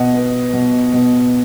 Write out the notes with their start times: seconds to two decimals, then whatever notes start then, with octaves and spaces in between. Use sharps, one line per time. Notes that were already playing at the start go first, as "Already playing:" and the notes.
Already playing: B2 D#5 F#5
0.14 B3
0.53 B2
0.93 B2